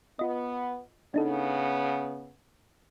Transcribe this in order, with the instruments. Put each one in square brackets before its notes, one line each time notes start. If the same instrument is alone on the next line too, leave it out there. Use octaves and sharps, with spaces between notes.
[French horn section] B3 [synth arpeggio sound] F4 D#5
[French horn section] C#3 B3 [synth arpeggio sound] D4 D#4 A4